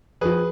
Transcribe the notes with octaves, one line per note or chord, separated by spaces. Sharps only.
F2 F3 G#4 B4